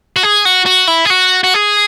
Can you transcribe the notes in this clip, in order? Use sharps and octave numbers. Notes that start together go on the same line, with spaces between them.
F#4
G#4
F#4
F#4
E4
G#4
F#4
F#4
G#4